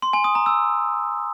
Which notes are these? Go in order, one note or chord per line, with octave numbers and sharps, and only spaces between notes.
C6
G#5
D#6
A#5
E6